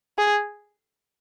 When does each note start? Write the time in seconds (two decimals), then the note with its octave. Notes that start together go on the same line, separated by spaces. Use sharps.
0.18 G#4